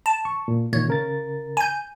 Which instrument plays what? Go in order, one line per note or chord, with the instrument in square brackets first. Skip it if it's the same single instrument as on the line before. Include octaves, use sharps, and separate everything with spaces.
[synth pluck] A5
[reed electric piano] C#6
A#2
[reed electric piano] A#2 D#3 [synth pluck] C#5
[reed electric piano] C#3 A#4 A6
[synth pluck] G#5 G6